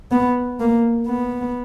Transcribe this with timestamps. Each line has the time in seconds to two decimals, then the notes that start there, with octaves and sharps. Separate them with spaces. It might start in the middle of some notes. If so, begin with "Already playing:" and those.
0.11 B3
0.60 A#3
1.07 B3